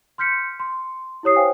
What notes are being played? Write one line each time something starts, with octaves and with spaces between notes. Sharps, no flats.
C6 F6 G6 B6 C#7
C6
E4 G4 C#5 D#6 C7
C5 C#5 F5 G5 G#5